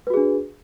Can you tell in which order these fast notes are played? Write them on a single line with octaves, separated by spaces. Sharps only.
B4 F#4 G#4 D4